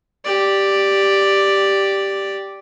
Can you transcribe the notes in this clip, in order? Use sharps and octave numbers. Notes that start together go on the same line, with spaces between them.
G4 D5